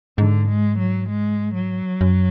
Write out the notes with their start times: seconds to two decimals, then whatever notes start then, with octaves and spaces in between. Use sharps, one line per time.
0.18 G#2 D3
0.49 G#3
0.79 F#3
1.09 G#3
1.54 F#3
2.01 F#2